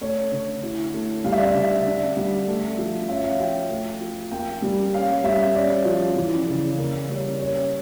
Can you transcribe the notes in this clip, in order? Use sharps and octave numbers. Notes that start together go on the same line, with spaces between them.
A3 C#5
D3
E4
A3
G3 F5
E5
D5
E5
D3
D4
G3
A3
F3
C#4 E5
F5
F3 G5
A3
F3
A#3 G5
G3
C#4 F5
G3 E5
C#4 D5
F3
E3
C#3
A#3 A#4
G3 C#5
C#4 C#5